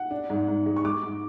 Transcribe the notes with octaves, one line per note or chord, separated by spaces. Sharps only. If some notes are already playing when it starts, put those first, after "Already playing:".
Already playing: F#5
D4
G#2
G#2
G#3
C#6
G#3 D6
G#2